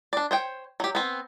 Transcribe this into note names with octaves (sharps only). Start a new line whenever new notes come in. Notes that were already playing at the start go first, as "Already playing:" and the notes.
D4 D5
C5 C#5 G5
F#3 G4
B3 C4